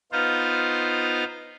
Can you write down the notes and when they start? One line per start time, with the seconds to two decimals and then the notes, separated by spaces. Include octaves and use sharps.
0.12 B3 D#4 F4 C5 F5